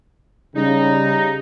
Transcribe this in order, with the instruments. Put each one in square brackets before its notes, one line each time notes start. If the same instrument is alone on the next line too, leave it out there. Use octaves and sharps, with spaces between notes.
[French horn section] C#3 G3 [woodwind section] D#4